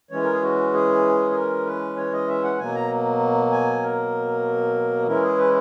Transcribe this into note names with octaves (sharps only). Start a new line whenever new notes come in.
E3 G#3 C#4 C#5
A#4
G#4
F#4
G#4
G#4
A#4
B4
C#5
D#5
E5
F#5
B2 F#3 A#3 G#5
A#5
G#5
A#4
E3 G#3 C#4 E4 A#4
G#4
B4